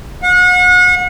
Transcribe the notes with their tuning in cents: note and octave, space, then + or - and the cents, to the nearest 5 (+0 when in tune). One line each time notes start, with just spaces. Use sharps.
F#5 -35